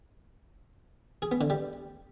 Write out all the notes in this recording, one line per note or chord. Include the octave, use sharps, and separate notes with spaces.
G#4
B3
D3
G3